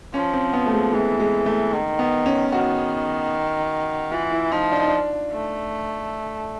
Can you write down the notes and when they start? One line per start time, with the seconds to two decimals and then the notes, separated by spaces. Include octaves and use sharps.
0.14 F3 C#4
0.33 C4
0.53 B3
0.66 A3
0.73 G#3
0.93 E3 G#3
1.20 G#3
1.46 A3
1.73 D#3
1.99 B3
2.26 C#4
2.52 D#3 F#4
4.12 E3 F4
4.32 E4
4.52 F3 D#4
4.72 D4
4.80 D#4
4.87 D4
5.31 A3